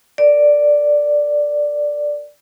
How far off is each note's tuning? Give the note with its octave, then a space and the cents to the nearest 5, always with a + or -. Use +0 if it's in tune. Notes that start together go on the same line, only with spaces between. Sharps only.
A#4 +0 D5 +0